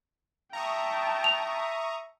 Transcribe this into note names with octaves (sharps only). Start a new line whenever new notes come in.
E5 G5 A5 A#5 C#6 D#6
F7